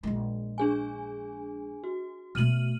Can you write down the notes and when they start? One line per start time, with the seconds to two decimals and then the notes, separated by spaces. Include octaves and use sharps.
0.03 A#1 G#3
0.58 D4 G#4 G#5
1.84 F#4
2.35 B2 A3 F6 D#7 F#7